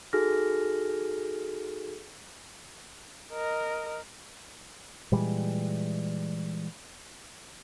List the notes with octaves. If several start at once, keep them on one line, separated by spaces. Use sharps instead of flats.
D#4 F#4 G#4 A4 F6 A#6
A#4 D#5
A#2 E3 G3 G#3